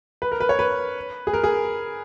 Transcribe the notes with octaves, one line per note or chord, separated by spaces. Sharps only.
B4
A#4
B4
C#5
B4
G#4
A#4
G#4